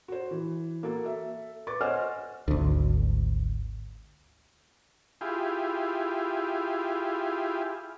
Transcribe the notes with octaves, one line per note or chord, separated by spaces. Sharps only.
F#4 C5
E3
A#3 F#4 A4
A4 E5
B4 C#6 D6 A6
C5 C#5 D#5 F#5 G#5 F6
G#1 D2
E4 F4 G4 G#4